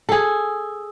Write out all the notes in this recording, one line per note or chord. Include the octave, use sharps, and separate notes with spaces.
G#4 A4